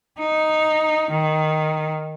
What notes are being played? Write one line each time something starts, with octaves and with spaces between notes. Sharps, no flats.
D#4
D#3